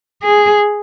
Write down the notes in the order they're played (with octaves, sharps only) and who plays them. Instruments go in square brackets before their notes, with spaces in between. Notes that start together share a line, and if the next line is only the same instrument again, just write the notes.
[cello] G#4